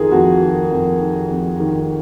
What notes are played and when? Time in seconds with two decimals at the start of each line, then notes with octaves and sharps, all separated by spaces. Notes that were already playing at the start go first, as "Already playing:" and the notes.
Already playing: F2 D#3 F4 G#4 A#4
0.11 F2 F#4
0.41 D#3
0.71 F2
1.00 D#3
1.31 F2
1.60 D#3